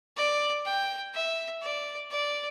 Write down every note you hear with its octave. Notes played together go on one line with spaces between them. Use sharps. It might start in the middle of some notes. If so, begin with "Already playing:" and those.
D5
G5
E5
D5
D5